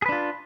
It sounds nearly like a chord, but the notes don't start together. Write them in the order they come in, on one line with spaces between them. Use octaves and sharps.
G#4 B4 D4 F4